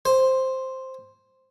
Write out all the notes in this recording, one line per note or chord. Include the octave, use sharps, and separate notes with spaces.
C5